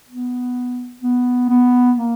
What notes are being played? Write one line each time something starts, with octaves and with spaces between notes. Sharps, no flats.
B3
B3
B3
A#3